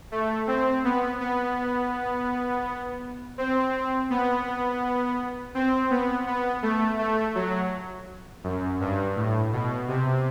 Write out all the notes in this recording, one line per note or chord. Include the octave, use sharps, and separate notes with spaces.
A3
C4
B3
B3
C4
B3
C4
B3
B3
A3
A3
F#3
F#2
G2
A2
B2
C3